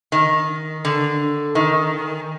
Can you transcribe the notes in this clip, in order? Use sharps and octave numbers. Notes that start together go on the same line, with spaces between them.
D#3
D3
D#3